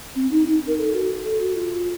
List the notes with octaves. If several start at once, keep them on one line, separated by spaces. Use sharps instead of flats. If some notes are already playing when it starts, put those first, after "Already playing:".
C4
D#4
D#4
A#4
A4
F#4
A4
F#4
F4